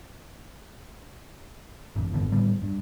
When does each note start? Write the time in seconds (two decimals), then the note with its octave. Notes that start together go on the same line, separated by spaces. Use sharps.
1.95 D1 A1 F#2 E3
2.13 G#1 D3 D#3 B3
2.32 A2 G3 B3
2.62 G2